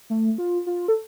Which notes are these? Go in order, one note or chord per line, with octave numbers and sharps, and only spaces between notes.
A3
F4
F4
A4